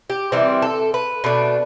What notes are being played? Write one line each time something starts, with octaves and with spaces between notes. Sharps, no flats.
G4
C3 E3 G3 C4
A4
B4
B2 A3 D4